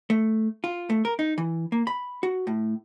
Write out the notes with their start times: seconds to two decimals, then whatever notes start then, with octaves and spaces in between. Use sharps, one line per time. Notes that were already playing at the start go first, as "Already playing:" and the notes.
0.10 A3
0.64 F4
0.90 A3
1.05 A#4
1.19 D#4
1.38 E3
1.72 A#3
1.87 B5
2.23 F#4
2.47 A2